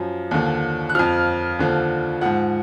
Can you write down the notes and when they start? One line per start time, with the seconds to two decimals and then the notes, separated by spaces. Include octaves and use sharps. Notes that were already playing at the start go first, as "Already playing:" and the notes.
Already playing: F#2 F3
0.31 D#2 D3 F3
0.90 F#6
0.95 F2 F3 F6
1.59 D#2 D3 F3
2.21 G#2 F3 F#5